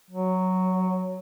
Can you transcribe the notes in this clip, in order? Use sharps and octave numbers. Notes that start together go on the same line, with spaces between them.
F#3